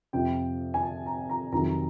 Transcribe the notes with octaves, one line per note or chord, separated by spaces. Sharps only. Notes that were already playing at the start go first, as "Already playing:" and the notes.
F2 C3 F3 G5
G#5
A5
A#5
A#5
F2 C3 D#3 F#3 A#5